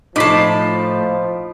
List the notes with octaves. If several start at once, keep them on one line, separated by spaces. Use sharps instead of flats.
A2 F3 D#4 A5 D6 B6 C7